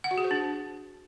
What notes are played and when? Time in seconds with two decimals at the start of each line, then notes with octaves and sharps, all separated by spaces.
0.04 F#5
0.11 F#4
0.18 G#4
0.24 C5
0.31 D4